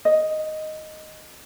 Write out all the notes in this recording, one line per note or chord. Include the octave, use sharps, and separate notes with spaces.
D#5